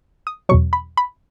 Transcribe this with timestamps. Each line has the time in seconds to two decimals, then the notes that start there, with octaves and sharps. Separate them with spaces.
0.27 D#6
0.49 E2 B2 F#3 C#6
0.73 B5
0.97 B5